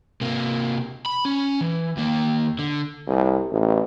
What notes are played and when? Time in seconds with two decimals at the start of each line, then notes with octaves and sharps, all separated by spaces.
0.21 C3 A#3
1.06 B5
1.25 C#4
1.61 E3
1.97 D#2 A#3
2.59 D3
3.08 C2
3.52 A1